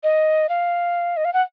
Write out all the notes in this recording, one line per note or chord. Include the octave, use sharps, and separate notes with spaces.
D#5
F5
D#5
F5
F#5